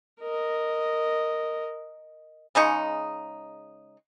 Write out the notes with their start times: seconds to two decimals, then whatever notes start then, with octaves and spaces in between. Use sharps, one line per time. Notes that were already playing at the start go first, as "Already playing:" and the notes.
0.21 A#4 D#5
2.55 C#3 G#3 D#4 C#6